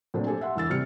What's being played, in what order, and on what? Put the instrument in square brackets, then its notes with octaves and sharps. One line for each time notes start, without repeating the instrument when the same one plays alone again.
[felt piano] A#2 F3 F#3 A3 C4 D4
G4 A4 G#5
E5 F#5 C6
E1 E3 E6 A6
C3 G3 F6 C#7